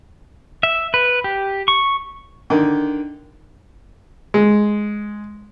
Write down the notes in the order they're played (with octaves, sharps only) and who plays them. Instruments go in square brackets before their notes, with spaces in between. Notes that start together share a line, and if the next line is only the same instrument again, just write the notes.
[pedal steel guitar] E5
B4
G4
C#6
[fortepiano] D3 D#3
G#3